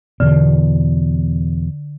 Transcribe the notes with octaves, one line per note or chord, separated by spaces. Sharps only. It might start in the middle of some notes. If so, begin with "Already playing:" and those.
E2 B2 D3